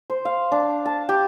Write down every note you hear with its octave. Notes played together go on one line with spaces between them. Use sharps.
C5
F5
D4
A5
G4